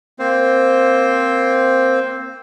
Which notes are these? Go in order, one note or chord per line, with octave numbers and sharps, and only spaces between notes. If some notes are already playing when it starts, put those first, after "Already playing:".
A#3 C4 C5